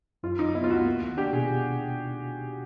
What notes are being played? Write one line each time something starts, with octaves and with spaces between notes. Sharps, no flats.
F#2 F4
F#2 D#4
B3 E4
F4
C#2 F#4
A#3
D#2
D4 G4
B2 G#4